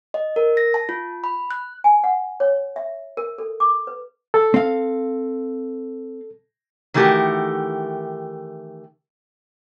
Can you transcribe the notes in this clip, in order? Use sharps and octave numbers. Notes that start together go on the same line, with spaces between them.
D#5
A#4
A#6
A5
F4
B5
F#6
G#5
F#5
C#5
E5
A#4
A4
D6
B4
A4
C4 F5
D#3 E3 A3 F#4 G4 A#4